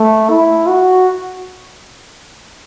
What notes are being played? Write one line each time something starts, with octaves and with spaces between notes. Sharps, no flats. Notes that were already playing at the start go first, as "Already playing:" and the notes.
Already playing: A3
E4
F#4